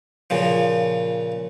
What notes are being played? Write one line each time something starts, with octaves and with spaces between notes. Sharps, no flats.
A#2 C#3 F3